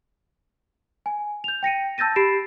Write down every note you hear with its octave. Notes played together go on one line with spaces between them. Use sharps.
G#5
G6 F7
G5 A#6 C#7 D#7
A5 E6 G6 A6 A#6 D#7
G4 B5 A6 C7 D7 E7